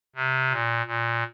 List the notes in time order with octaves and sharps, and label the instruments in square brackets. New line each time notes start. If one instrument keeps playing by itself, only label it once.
[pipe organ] C3
A#2
A#2